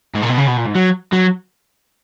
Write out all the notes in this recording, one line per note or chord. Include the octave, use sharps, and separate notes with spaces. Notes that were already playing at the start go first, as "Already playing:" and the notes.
G#2
A#2
B2
C#3
B2
A#2
G#2
F#3
F#3